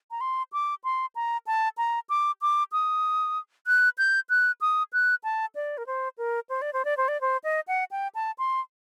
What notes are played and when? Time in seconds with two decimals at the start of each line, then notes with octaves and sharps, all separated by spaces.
0.11 A#5
0.21 C6
0.53 D6
0.84 C6
1.15 A#5
1.47 A5
1.78 A#5
2.09 D6
2.42 D6
2.72 D#6
3.67 F#6
3.98 G6
4.29 F#6
4.61 D#6
4.93 F#6
5.24 A5
5.55 D5
5.78 A#4
5.87 C5
6.18 A#4
6.50 C5
6.62 D5
6.73 C5
6.85 D5
6.97 C5
7.08 D5
7.21 C5
7.44 D#5
7.68 F#5
7.91 G5
8.15 A5
8.38 C6